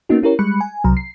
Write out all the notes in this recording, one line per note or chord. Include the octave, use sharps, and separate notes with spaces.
A#3 B3 C#4 D#4 F#4
C#4 E4 G4 A#4 C#5
G3 G#3 B5 F#6 C#7
G#5
C2 C3 F#3 A#5
C7